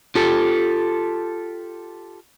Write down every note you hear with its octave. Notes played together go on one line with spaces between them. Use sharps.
F4 G4 A4